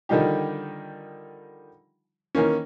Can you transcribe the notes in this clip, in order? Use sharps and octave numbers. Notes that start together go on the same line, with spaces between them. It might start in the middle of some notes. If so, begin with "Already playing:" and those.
D3 D#3 F3 G3 D#4 G4
D#3 E3 A#3 C#4